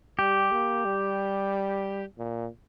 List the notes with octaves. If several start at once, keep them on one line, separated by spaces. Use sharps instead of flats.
G3 G4
A#3
G3
A#2